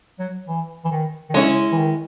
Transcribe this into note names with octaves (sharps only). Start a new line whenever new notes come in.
F#3
E3
E3
D#3
D#3
C#3 G#3 C#4 E4
E3
D#3